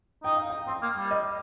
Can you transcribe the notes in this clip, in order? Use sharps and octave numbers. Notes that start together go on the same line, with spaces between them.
D#4 G5
F5
G5
C4 G5
A#3
G3
D#5